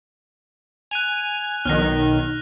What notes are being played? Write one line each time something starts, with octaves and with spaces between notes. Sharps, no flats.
G#5 F#6 D#7 F7
B1 D#3 F6 F#6 A#6